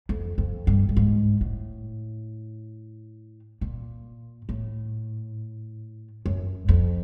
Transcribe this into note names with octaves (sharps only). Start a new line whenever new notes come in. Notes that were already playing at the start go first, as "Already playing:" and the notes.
F2
F2
G2
G2
G#2
A2
A#2
A2
F#2
F2